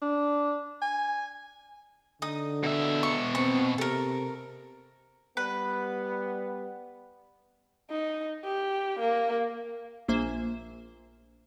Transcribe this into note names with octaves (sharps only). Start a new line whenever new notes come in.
D4
G#5
D3 D#4 D#6
B2 E5
C#6
C4 C#6
C3 A4 A#4
G3 B3 B4
D#4
G4
A#3
A#1 A#3 C5 E5 G#5 E7